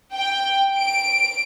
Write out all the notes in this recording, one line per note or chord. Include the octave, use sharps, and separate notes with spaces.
G5
D7